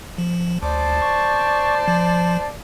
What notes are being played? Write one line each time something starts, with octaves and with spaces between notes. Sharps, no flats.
F3
D2 C5 D5 A5
C#6
F3